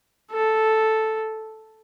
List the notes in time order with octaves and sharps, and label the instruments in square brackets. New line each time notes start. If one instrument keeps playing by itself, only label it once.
[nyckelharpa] A4